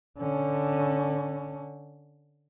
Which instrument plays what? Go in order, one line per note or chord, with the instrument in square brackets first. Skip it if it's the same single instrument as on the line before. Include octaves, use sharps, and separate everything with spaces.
[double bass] D3 C#4